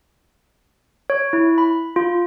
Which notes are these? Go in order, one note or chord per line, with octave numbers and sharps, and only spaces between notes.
C#5
E4
B5
F4